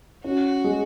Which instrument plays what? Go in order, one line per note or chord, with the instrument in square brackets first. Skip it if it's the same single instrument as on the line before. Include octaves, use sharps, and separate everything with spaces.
[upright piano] C#4 [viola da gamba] F#4
[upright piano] G#3